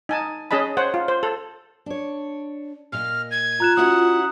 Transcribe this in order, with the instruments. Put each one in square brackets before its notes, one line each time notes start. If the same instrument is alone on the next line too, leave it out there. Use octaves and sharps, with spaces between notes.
[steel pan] D#4 G#5 A5
C#4 G#4 D#5 A5 B5
C5 C#5 F#5
F4
C5
A4
[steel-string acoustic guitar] D4 C#5
[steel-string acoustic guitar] A#2 D#5 [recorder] F6
[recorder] G#6
[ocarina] F4 [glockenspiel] A#5 F#6 E7
[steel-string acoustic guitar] C#4 E4 F#4 [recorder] F#5 [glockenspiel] D#6